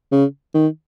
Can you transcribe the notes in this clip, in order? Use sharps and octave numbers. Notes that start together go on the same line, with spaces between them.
C#3
D#3